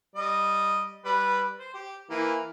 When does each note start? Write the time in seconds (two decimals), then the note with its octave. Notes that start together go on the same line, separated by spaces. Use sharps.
0.16 G3 D#5
1.05 G3 B4
1.59 C5
1.74 G4
2.10 E3 A#3